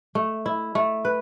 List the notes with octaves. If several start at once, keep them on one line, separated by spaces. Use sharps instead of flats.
A3
E4
A3
B4